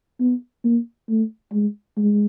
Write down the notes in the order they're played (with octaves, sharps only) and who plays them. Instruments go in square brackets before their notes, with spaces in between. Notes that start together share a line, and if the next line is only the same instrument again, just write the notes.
[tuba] B3
A#3
A3
G#3
G#3